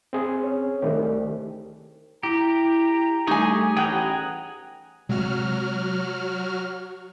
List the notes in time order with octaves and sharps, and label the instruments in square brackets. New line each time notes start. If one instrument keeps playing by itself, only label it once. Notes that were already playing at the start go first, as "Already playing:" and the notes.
[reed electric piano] C4 G#4
[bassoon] C#4
[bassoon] C2 [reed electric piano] D#3 A3 G4
[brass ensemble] E4 [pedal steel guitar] G4 [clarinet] A#5
[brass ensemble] G3 A3 [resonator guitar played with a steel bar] D#4 G#5 [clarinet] G4 [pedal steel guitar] G#4 C#6
[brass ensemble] A1 [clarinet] E4 [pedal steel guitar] G#4 F#5 A#5 [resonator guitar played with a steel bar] G5
[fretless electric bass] C3 G#3 [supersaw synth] F#3 F#4 F6